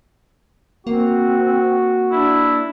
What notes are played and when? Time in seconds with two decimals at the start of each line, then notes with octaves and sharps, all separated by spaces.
0.87 A#3 C4 F#4
2.11 D4 E4